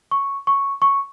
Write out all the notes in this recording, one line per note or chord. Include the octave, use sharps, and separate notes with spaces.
C#6
C#6
C#6